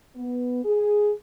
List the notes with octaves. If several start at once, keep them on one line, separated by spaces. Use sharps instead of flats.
B3
G#4